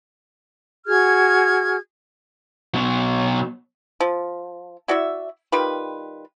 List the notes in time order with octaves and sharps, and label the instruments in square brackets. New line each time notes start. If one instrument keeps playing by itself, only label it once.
[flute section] F#4 G#4 F6 G#6
[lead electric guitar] B2 F#3
[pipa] F3
E4 F#4 D5 E5
D#3 G3 F4 B4